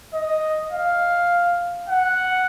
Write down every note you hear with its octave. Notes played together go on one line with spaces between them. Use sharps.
D#5
F5
F#5